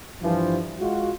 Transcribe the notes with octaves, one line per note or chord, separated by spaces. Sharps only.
G2 E3 F3
G#3 F4 F#4